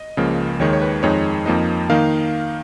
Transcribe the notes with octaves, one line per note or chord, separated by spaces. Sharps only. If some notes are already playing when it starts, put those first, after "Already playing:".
Already playing: D#5
C#2 C#3 F3 A#3
D#2 D#3 G#3 C#5
C#5
B4
F2 D#3 G#3 D#4 C#5
F2 F3 A#3 D#4
D#3 A#3 D#4 F5